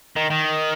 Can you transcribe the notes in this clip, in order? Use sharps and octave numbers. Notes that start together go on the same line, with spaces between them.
D#3
D#3